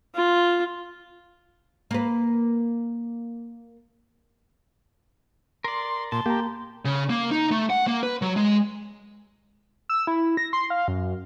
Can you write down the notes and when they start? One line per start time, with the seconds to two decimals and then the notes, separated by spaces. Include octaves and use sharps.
0.15 F4
1.91 A#3 B4
5.64 A#4 D5 C6
6.12 A#2 A5 C6
6.26 A#3 G4 A#5
6.85 C#3
7.10 A#3
7.31 D#4
7.51 A3
7.70 F#5
7.87 A#3
8.03 B4
8.22 F#3
8.36 G#3
9.89 E6
10.07 E4
10.37 A#6
10.53 C6
10.70 F5
10.88 F#2